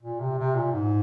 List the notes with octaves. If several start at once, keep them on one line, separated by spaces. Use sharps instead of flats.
A#2
C3
C3
A#2
G#2